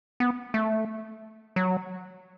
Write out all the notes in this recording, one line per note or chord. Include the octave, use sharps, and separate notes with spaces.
B3
A3
F#3